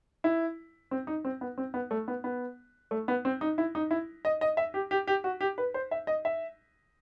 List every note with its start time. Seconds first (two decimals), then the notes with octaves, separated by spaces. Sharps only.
0.24 E4
0.91 C4
1.07 D#4
1.25 C4
1.41 B3
1.58 C4
1.74 B3
1.91 A3
2.08 B3
2.24 B3
2.91 A3
3.08 B3
3.25 C4
3.41 D#4
3.58 E4
3.75 D#4
3.91 E4
4.25 D#5
4.41 D#5
4.57 E5
4.74 G4
4.91 G4
5.07 G4
5.24 F#4
5.41 G4
5.58 B4
5.74 C5
5.91 E5
6.07 D#5
6.25 E5